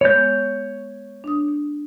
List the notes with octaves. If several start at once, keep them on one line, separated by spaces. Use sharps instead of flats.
G#3 B3 C#5 G6
D4 D#6